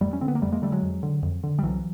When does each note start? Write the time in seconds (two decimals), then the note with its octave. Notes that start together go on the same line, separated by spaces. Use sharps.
0.01 F2 G3 A3
0.13 C#4
0.21 D3 C4
0.28 B3
0.35 A#3
0.42 F2 G3 A3
0.52 G#3 A#3
0.62 D3 G3 A3
0.72 F#3 G#3
0.83 F2
1.03 D3
1.23 F2
1.43 D3
1.59 G3
1.63 C2 E3 F#3